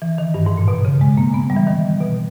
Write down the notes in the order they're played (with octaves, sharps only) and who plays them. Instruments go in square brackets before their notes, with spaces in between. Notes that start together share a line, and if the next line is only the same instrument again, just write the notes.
[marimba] E3
D#3
G2
G#2
A#2
B2
C#3
G#3
A#3
B3
G3
E3
D#3
B2